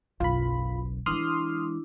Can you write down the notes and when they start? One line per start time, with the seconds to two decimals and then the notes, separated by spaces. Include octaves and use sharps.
0.20 F#1 B1 F4 B5
1.06 E3 G#3 D4 E4 C6 D#6 F6